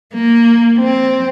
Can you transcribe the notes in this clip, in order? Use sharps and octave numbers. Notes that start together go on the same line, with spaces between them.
A#3
C4